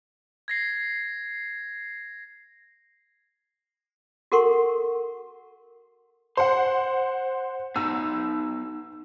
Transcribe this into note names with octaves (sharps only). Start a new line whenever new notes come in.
G#6 A#6 C7
F#4 A4 A#4 F#5 C6 C#6
C5 F#5 C6
B3 D#4 E6